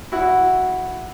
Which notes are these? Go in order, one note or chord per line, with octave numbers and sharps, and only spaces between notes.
E4 F#4